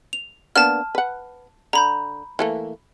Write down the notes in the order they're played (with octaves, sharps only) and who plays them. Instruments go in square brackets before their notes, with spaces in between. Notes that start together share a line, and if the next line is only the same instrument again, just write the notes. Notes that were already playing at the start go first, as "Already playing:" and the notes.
[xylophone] F7
[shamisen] A#3 B3 D4 [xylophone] A5 F6
[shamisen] B4 F#5
[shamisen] D3 [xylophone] A#5 B5 G6
[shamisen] E3 A3 A#3